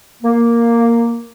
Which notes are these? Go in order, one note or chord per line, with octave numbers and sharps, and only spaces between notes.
A#3